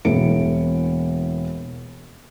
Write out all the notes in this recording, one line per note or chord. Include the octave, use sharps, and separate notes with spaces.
E1 E3 A#3 B3 C#7 D7